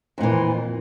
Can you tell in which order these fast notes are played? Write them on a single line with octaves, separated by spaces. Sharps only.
F2 A#2 E3